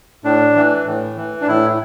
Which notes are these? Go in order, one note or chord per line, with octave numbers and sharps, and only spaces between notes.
A2 D4
E3
A2
E3
D4
A2 E4